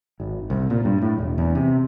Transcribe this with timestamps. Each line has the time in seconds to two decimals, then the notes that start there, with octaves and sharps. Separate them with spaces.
0.20 G#1
0.50 C2
0.70 A#2
0.85 G2
1.02 A2
1.18 E1
1.38 E2
1.55 C3